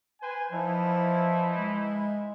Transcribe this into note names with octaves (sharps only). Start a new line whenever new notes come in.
B4 C5 G#5
E3 F3 D#4 E4
G#3